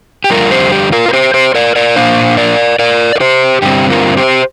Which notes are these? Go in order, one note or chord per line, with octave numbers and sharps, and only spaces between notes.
G4
F2 D3 G3 F4 A#4
G4 C5
G4
F4 A#4
A#4
G4 C5
G4 C5
A#4 D5
A#4 D5
A#2 A#3 D4 C5 F5
A#4 D5
A#4 D5
A#4
G4 C5
G2 D3 G3 C4 G4
F4 A#4
G4 C5